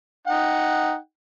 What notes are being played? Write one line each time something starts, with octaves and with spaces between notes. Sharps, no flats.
D#4 F#5 G5